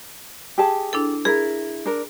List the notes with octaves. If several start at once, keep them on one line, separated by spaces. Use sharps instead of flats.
G4 G#4 A5
D4 E4 A4
E4 G#4 A#4
D4 A#4